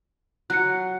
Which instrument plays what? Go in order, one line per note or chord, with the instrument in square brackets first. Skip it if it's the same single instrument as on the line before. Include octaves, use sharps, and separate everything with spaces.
[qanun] F#3 [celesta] F#6 C#7